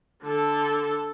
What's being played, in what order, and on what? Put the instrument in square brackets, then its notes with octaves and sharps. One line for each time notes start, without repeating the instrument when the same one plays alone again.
[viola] D3 A4